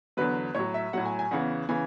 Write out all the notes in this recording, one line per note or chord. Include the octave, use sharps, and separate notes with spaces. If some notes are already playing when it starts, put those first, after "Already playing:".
E2 D3 F#3 B4
A2 F#3 C#5
E5
A2 F#3 F#5
G#5
G#5
E2 C#3 E3 F#5
C#3 E3 G#5